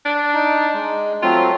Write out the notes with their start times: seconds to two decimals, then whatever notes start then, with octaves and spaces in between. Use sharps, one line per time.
0.05 D4
0.34 D#4
0.74 G#3
1.22 F#3 A3 C4 F4